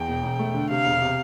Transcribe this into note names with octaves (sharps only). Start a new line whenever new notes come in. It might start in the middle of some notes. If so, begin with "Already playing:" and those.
Already playing: E2 G5
E1
E1
A3
D3
C3 F5
E1
C3